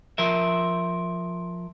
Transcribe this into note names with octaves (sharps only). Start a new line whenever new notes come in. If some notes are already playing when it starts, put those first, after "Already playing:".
F3 A#4 E5